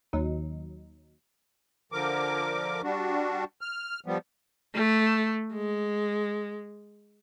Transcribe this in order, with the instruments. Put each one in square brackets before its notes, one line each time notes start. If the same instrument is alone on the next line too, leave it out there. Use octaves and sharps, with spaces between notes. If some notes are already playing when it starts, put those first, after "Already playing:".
[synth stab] D#2 F#3 D#4
[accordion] D3 F3 A#4 D6
G3 D4 F#4
F6
F3 G3 B3
[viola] A3
G#3